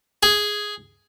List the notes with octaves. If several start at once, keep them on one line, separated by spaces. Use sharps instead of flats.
G#4